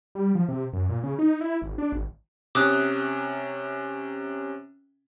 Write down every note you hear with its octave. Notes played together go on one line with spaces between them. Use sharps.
G3
F3
C3
F#2
A#2
C#3
D#4
E4
G#1
D4
G#1
C3 C#4 D6 D#6 F#6